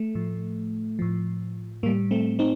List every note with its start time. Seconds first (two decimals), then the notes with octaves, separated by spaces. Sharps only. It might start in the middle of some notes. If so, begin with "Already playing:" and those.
Already playing: A3
0.15 A2 F3
0.99 A2 F3
1.83 A2 G3 A#3
2.11 A3 C4
2.39 C4 D#4